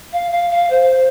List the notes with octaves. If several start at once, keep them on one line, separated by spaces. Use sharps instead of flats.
F5
F5
F5
C5